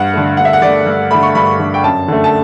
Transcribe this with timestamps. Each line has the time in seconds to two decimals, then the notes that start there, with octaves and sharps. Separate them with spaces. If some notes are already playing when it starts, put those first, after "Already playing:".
Already playing: G2 F#5
0.14 D3 A3
0.37 G2 F#5
0.45 E5
0.53 F#5
0.62 D3 A3 D5
0.86 G2
1.11 D3 A3 B5
1.23 C#6
1.35 G2 B5
1.59 D3 A3
1.74 G5
1.83 F#2 A5
2.08 D3 A3
2.24 A5